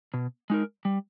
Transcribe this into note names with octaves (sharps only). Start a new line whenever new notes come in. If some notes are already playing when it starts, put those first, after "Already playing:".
B2
G#3 D#4 A#4
G3